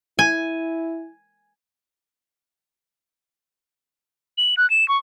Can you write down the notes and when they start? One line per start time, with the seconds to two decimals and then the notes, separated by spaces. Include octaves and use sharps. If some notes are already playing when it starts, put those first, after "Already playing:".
0.19 E4 G#5
4.38 F#7
4.57 F#6
4.70 E7
4.88 C#6